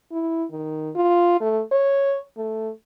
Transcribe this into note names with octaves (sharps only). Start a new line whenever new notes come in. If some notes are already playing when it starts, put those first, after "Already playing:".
E4
D#3
F4
A3
C#5
A3